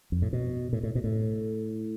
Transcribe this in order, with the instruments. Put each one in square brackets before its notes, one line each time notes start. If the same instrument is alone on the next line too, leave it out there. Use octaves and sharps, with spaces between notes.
[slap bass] F2
A2
B2
A2
A2
B2
A2